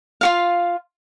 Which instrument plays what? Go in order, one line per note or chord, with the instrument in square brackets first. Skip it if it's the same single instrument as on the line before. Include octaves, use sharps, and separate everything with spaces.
[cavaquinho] F4 F#4 F5